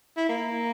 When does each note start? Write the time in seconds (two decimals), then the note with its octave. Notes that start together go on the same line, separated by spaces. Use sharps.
0.17 E4
0.29 A#3